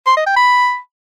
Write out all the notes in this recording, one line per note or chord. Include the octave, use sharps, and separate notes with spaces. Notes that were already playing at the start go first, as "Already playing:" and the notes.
C6
D#5
G5
B5